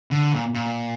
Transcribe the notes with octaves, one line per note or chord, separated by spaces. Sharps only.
D3
A#2
A#2